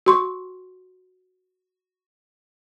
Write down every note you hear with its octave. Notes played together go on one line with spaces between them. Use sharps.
F#4 C6 C#6